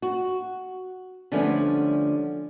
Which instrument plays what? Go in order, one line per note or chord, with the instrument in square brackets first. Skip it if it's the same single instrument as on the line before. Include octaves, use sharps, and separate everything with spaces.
[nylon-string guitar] F#4
D3 F3 G3 A3 B3 C#4